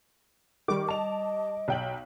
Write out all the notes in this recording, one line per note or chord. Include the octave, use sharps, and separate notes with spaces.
D#3 G3 D6
D#5 A5 F7
B1 G5 F#7